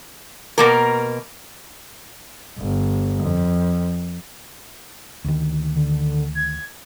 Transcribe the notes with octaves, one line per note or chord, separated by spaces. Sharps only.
B2 A#3 A#4
G1
F2
D2 D#3
D3
G#6